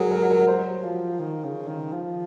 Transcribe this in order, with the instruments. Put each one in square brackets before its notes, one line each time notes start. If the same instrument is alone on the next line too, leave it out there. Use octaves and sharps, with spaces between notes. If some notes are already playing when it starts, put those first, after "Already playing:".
Already playing: [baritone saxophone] F#3 [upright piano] G#4 A#4
[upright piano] A#4
A#4
[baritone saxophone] F#3 [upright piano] C5
[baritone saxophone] F3
D#3
C#3
D#3
F3